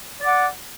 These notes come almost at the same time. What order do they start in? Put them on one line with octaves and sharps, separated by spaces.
D5 D6 F#5